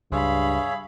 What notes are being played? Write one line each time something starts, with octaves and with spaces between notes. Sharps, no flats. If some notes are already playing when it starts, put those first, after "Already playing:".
C#2 G2 G#4 C#5 E5 F5 B5